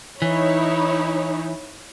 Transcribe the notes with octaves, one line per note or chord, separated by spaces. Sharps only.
E3 D#4 E4 C#5